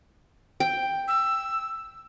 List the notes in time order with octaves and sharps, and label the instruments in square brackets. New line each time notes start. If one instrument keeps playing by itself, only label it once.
[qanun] G5
[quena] E6